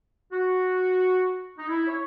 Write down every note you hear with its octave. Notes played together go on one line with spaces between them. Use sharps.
F#4
D#4
E4
C#5